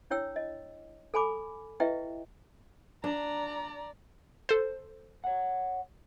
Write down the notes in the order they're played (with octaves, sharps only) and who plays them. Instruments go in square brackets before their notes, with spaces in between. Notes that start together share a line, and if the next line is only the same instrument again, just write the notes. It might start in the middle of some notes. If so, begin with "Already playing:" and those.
[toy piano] D4 E4 C#5 G5 E6
D#5
A4 G#5 B5 D6
E4 G4 B4 D#5 E5 G5
[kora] D4 [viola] D5 [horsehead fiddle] A#5
[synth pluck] A4 C5
[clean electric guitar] C#5 F#5